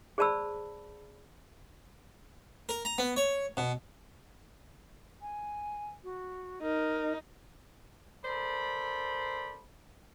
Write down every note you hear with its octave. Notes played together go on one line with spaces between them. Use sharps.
G#4 C5 D5 A5 B5 E6
A#4
A#5
B3
C#5
B2
G#5
F#4
D#4 A#4
A4 A#4 C5 D5 B5